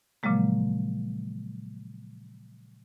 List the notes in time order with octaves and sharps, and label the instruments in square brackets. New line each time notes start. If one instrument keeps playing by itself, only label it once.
[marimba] A#2 C#3 F3 F#3 G#3 A#3